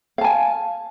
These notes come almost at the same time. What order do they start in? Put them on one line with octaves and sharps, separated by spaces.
F5 A5 G#5